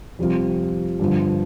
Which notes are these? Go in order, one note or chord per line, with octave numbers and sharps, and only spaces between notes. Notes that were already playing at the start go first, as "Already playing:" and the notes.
F2 C3 G3 C4 F4
G2 D3 F3